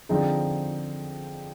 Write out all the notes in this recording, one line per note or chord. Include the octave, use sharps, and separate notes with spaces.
D3 F3 C4 D#4 G#4